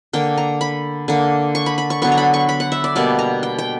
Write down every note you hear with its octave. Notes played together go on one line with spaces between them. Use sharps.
D3 A#3 G5
A#5
B5
D3 A#3
C#6
B5
B5
C#6
D3 F#3 B3 C#6
A#5
B5
C#6
B5
F#5
E5
D5
B2 G3 A#3 D5
A#5
G5
G5